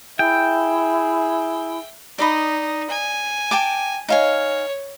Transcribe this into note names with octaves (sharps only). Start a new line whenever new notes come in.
E4 G#4 E5 G5
D#4 D5 D#5 B5
G#5
G5 A5 D6
D#4 C#5 F5 G#5